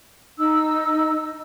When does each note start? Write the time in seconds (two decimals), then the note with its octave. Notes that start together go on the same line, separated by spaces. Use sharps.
0.38 D#4 E6